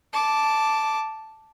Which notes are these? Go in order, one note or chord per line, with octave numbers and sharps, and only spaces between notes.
A5 D6